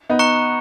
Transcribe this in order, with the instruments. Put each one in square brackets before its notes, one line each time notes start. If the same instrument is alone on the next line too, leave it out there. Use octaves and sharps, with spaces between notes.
[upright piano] B3 D#4
[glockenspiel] A#5 C#6 F#6 C#7